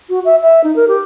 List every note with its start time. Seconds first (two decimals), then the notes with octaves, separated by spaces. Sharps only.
0.09 F#4
0.25 E5
0.42 E5
0.63 D#4
0.76 A#4
0.88 G4